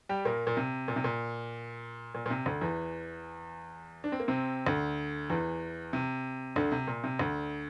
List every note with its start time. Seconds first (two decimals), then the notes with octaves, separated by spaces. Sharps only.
0.09 G3 G4
0.25 A#2 A#3
0.47 A#2
0.57 C3
0.88 A#2
0.96 C3
1.04 A#2
2.15 A#2
2.26 A#2
2.30 C3
2.46 D2 D3
2.61 E2 E3
4.04 D4
4.12 C4
4.20 A#3
4.28 C3 C4
4.67 D2 D3
5.30 E2 E3
5.93 C3
6.56 D2 D3
6.72 C3
6.87 A#2
7.04 C3
7.19 D2 D3